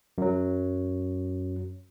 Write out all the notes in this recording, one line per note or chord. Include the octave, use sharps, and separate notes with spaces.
F#2 F#3